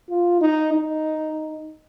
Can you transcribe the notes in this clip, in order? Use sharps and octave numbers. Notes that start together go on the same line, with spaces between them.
F4
D#4
D#4